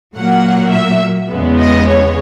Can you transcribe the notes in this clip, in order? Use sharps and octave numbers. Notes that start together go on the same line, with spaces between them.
A#2 F#3 A#3 F#5
E5
E2 C#3 G#3 B3
D#5
C#5